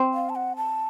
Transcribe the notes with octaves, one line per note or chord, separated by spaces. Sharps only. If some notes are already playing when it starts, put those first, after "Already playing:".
Already playing: C4
F5
A5
F#5
A5